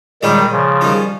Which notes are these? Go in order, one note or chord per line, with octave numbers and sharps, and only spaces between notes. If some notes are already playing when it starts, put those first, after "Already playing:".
A#2 D#3 G3 G#3 D#4 G#4 C#5
C#3 F3
D#3 G3 C#4 F4